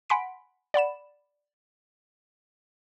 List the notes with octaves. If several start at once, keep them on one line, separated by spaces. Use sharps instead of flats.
F#5 G#5 B5 C6 B6 D7
D5 F#5 B5 E7